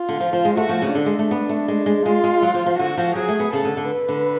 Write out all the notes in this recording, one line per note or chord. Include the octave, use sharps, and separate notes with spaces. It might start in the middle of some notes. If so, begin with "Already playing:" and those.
Already playing: F4
D3
F3
F3
G#3
A3 F#4
F3
C#3
D3 D4
G#3
A3
B3
A3
G#3
G#3
G#3 F4
G#3
F#3
F3
F3
D3 F#4
F3
F#3 G#4
A3
B3
C#3 A4
D3
D3
B4
D3